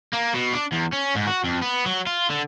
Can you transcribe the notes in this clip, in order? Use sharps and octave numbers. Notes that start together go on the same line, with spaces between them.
A#3
B2
D4
E2
C#4
G#2
F#4
F2
B3
F#3
F4
D3